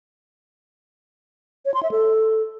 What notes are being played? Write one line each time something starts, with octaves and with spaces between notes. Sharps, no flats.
C#5
C6
E5
A4